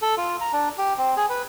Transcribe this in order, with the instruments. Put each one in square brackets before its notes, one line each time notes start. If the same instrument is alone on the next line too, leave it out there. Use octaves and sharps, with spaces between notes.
[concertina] A4
F4
A#5
D4
G4
C4
G#4
B4